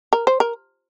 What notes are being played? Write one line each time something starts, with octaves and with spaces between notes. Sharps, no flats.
A#4
C5
A#4